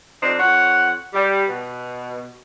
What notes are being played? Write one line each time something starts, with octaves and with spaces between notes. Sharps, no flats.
F2 C4 D4 D#4
F2 C#5 F#5
G3
B2